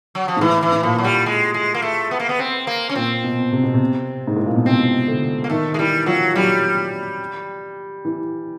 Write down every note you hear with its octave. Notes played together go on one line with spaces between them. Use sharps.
F#3
F3
G#2
A2 E3
E3
A2
A#2 F3
F#3
G3
G#3
G#3
A#3
A3
B3
A#3
B3
C4
A#3
C#4
A#2 C4
B2
C3
B2
C3
G#2
A2
A#2
B2
C3 C4
D3
A#3
D#3 A3
G#3
E3 G3
F3 F#3
F#3 G3
E3